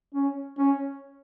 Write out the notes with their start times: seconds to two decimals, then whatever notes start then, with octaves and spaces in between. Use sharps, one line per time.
0.14 C#4
0.58 C#4